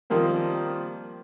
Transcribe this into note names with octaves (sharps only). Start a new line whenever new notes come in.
D#3 F3 G3 A#3 C4